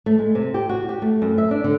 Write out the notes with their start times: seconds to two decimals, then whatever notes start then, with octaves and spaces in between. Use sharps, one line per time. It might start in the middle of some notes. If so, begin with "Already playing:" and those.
0.06 A3
0.19 G#3
0.35 C3
0.54 G4
0.69 F#4
0.89 G4
1.02 A3
1.22 F#2
1.38 E5
1.51 D4
1.64 D3